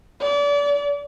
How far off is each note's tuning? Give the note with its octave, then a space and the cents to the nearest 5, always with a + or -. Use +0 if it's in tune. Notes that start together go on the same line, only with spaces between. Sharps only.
D5 -35